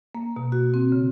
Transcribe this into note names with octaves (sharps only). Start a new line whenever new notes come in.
A#3
B2
F#4
C4
C#3